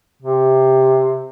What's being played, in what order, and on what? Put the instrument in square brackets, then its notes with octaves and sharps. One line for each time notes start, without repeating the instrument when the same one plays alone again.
[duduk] C3